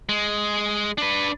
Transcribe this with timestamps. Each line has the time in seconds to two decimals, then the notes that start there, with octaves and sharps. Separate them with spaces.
0.09 G#3
0.98 D4 B4